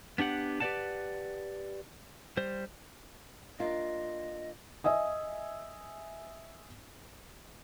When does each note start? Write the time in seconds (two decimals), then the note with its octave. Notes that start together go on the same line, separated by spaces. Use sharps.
0.18 B3 D4 G4 F#5
0.60 G4 B4 C5 D5 F#5 A5
2.37 G3 C5
3.59 A#3 D4 F4 D#5
4.84 D#5 E5 G#5 D#6